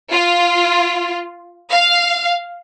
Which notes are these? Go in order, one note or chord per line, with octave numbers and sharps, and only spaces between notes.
F4
F5